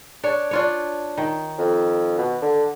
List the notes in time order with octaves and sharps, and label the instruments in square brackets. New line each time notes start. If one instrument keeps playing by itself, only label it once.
[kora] D4 C#5
D4 F4 C#5
D#3
[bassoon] F2
B2
D3